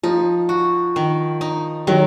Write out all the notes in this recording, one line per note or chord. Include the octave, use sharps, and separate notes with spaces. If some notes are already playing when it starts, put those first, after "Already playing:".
F3 D#4
F#4
D#3
D#4
D#3 F#3